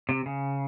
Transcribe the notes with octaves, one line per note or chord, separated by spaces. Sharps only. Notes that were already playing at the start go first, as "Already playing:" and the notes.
C3
C#3